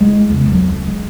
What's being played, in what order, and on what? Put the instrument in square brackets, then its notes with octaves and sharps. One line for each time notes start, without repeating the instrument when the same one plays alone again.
[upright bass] G#3 E4
E2 C#3
F2 F#3
C#2
G#3